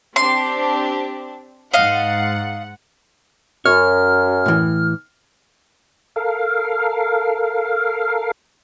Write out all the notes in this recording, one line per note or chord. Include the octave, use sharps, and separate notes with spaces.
C4 D4 G4 C6
G#2 D#5 F5 F#5
F#2 C#5 F6
A2 E3
A4 A#4 F5